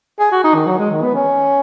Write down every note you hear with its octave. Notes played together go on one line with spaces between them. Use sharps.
G#4
F#4
D#4
D#3
F#3
G#3
D#3
B3
C#4